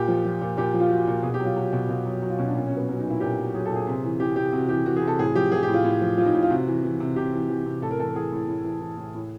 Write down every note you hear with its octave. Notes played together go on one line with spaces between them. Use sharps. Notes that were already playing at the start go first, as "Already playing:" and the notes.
Already playing: A#2 G4
F3
F3
A#2
A#2 G4
F3
F4
F3 F#4
A#2
B2 G#4
G4
F#3
F4
F#3
B2
B2 F4
F#3
F#3 F#4
F4
B2 C#4
D4
A#2 C#4
C#4
F#3
B3
F#3 C#4
D#4
A#2
E4
A#2 G4
F#3
F#3 G#4
A4
A#2 G#4
C3
E3
E3 G4
C3 G4
C3 F#4
E3 G4
E3 F#4
G#4
C3 A4
A2 G#4
F3 G4
F3 G#4
G4
A2
F4
A2
F3
F3 F4
D#4
A2
F4
C3 F#4
E3
E3
C3
C3 G4
E3
E3
C3
A2 A4
A#4
E3 A4
A#4
E3 G#4
A2
A2
E3
E3
A2
A2